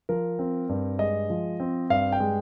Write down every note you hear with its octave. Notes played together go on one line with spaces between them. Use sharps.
F3 A#4
C4
G2
G#3 D#5
F3
C4
G2 F5
G5
G#3